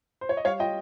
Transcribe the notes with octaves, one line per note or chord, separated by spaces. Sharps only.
C5
C#5
D#5
G3 C#5 F5
F4 D#5 G5